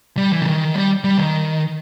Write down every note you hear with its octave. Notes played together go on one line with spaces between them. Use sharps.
G3
E3
C#3
D#3
G3
G3
D#3